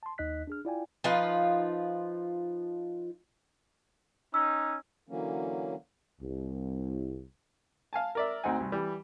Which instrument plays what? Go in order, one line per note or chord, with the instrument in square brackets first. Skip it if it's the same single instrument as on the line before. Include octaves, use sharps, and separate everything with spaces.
[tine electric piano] A5 C6
D#2 D#4 D#5 F#6 B6
D4 G#4 F6
E4 F4 D5 F5 G5 G#5
[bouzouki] F3 D#4 F4 B4
[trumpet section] C#4 D#4 [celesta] E6
[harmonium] D3 E3 F#3 A#3 C#4
[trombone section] C2
[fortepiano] F5 G#5 A5
A#4 D5 E5
D2 C4 D#4 F#5 G#5
C2
E3 G3